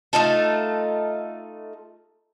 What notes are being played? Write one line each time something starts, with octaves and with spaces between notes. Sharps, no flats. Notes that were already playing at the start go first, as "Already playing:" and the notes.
A3 D#4 F4 A4